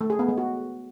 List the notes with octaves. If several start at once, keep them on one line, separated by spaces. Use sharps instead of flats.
A3
G#4
B3
G#3
F#4